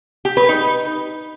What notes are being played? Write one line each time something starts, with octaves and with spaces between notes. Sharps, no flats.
G4
B4
D#4